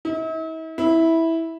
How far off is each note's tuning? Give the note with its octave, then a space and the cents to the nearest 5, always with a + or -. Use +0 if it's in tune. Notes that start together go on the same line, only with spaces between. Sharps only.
E4 -45
E4 -10